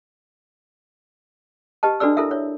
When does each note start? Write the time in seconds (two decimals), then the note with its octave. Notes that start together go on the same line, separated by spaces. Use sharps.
1.83 G4 B4 D#5 A5
2.00 D4 F#4 A4 B4 D5 E6
2.17 E4 A4 A#4 E5
2.31 C#5